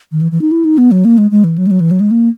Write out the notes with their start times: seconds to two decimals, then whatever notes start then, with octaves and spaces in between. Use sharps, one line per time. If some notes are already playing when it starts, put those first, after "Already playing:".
0.12 D#3
0.21 E3
0.32 E3
0.41 D#4
0.51 E4
0.65 D#4
0.78 B3
0.91 F#3
1.05 A#3
1.18 G#3
1.31 G#3
1.44 E3
1.58 F#3
1.67 G#3
1.71 F#3
1.80 E3
1.91 F#3
2.00 G#3
2.11 A#3